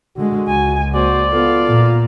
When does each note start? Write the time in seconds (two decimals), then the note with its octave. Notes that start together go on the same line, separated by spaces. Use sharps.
0.16 D3 G#3 F#4
0.48 C#2 G#5
0.95 A#3 F#4 C5 D5
1.33 B3 F4 A4 F5
1.68 A#2 A#3